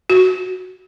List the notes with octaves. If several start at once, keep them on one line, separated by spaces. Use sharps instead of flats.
F#4